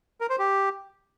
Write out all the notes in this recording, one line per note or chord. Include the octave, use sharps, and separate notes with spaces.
A#4
C5
G4